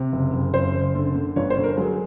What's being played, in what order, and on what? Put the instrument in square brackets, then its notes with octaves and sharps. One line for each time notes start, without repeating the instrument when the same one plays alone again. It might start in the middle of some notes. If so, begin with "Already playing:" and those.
Already playing: [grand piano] C3
F#1
F#1
F#1 C5
F#1
D3
D3
G1 C#5
C5
D3
A#4
F#3 G#4